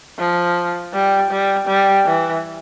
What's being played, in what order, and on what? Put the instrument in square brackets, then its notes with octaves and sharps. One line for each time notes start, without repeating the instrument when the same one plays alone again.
[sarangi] F3
G3
G3
G3
E3